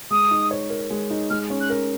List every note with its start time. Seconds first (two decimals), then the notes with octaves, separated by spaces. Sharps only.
0.11 G#3 D#6
0.31 D#4
0.51 C#5
0.70 A#4
0.90 G#3
1.10 D#4
1.30 G#3 F6
1.50 C#4
1.61 F#6
1.70 A#4